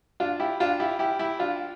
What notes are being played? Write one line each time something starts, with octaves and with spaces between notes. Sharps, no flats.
D4 F4
E4 G4
D4 F4
E4 G4
E4 G4
E4 G4
D4 F4